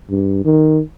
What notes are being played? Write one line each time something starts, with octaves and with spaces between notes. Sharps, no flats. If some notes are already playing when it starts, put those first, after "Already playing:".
G2
D#3